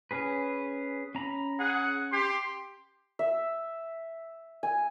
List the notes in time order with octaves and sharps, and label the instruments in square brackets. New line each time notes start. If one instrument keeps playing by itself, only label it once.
[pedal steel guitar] C#4 G#4 B4
C#4 A#5 B5
[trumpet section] G#4 F#5
G4 C6
[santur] E5
G#5